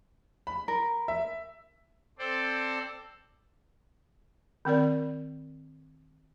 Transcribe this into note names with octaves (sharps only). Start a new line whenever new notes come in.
B5
A#4
E5
C4 A4 C5 D5
D#3 C4 A#4 D5